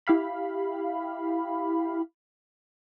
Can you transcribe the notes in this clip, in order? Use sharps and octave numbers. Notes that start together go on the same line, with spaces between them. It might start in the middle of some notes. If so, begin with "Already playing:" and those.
E4 G4 F5 B5